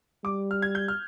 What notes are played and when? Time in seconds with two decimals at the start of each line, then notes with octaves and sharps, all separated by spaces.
0.24 G3 D6
0.51 F6
0.62 G#6
0.75 G6
0.88 F6